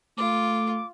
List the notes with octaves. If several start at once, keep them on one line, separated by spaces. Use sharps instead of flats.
A3 F4 D6